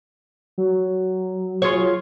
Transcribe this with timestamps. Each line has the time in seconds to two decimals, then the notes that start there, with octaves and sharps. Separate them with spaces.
0.58 F#3
1.62 F4 G#4 C#5